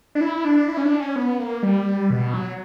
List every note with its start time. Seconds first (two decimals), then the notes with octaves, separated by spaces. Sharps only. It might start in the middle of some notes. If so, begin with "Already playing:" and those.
0.15 D4
0.21 E4
0.45 D4
0.68 E4
0.77 C#4
0.84 D4
0.99 C#4
1.16 B3
1.39 A#3
1.63 G3
2.10 B2
2.34 F#3